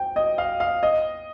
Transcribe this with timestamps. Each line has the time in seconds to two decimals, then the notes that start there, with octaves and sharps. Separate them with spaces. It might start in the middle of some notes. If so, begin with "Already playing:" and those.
Already playing: G5
0.16 D#5
0.38 F5
0.60 F5
0.83 D#5